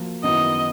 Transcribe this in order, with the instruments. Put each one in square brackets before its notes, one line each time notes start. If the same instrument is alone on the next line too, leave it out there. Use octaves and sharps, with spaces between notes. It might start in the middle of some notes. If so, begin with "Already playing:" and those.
Already playing: [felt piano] F3 A#3 F#4
[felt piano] F#2 D#3 F#3 B3 E4 [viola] D#5